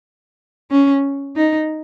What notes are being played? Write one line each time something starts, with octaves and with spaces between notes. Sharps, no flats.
C#4
D#4